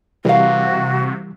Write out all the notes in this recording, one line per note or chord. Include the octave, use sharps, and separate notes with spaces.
C3 E3 G3 F#4 A#4 F5